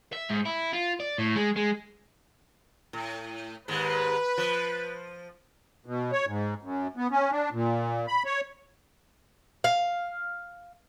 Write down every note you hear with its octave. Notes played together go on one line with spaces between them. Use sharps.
E5
G#2
E4
F4
D5
A2
G#3
G#3
A2
D#2 G#2 G#3 B4
F3
B2
C#5
G#2
F#2
B3
C#4
D4
A#2
B5
C#5
F5